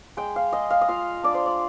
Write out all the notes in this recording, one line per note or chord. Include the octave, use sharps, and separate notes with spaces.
G#3 G5
F5
G#3 D#5
F5
D#5
F4 F5
D4 D5
C5
D5